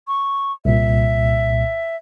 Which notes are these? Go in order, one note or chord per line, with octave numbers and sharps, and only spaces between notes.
C#6
C2 A#2 E5